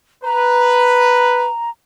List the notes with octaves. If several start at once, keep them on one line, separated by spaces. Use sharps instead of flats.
B4 A#5